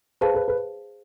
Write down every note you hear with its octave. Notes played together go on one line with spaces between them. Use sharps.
G#4 B4 C5 F5 A5
B4
B4